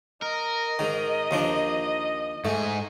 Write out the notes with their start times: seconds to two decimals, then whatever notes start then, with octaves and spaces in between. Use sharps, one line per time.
0.22 A#4 D#5
0.79 G#2 D#3
1.31 D#2 F3 D4
2.45 G#2 A3 G#4